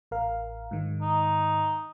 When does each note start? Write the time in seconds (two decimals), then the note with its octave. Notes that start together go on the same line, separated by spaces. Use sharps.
0.11 A1 A#4 F5
0.71 G#2 D#3
1.02 D#4